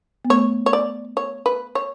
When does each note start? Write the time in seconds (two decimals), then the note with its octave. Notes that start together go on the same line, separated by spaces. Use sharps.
0.25 B3
0.30 A3 C#5
0.66 C#5
0.73 D5
1.17 C#5
1.46 B4
1.75 C#5